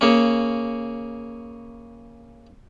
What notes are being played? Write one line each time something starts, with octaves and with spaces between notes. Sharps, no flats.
C#3 A#3 C#4